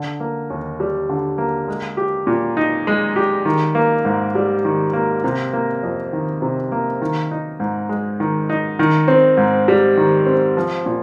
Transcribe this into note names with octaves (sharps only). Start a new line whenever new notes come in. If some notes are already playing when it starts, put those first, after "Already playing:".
Already playing: D3
A#3
D#2
G3
D3
A#3
G#3
G4
A#2
D#4
G#3
G4
D#3
A#3
G#2
G3
D#3
A#3
C3
A#3
F2
D#3
C3
A#3
D#3
D#4
G#2
G#3
D#3
D#4
D#3
C4
G#2
G3
D#3
C4
F3
A#2